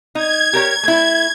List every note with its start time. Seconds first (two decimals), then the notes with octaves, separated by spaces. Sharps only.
0.15 D#4 G#6
0.53 G4 A#4 C#5
0.83 A3 E4